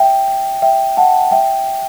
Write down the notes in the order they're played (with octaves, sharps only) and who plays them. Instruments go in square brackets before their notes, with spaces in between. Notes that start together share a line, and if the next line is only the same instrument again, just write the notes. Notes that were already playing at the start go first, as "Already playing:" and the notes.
Already playing: [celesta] E5 G5
E5 G5
F#5 A5
E5 G5